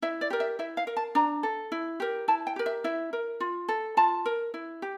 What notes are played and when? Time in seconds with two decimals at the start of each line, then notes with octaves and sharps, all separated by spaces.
0.02 E4 E5
0.21 D5
0.30 G4 A#4
0.40 E5
0.59 E4 E5
0.77 F5
0.87 A#4
0.97 A5
1.15 D4 A#5
1.43 A4
1.72 E4
2.00 G4 A#4
2.28 E4 A5
2.47 G5
2.56 G4 A#4
2.66 E5
2.84 E4 E5
3.13 A#4
3.40 F4
3.69 A4
3.97 F4 A5
4.26 A#4
4.54 E4
4.82 G4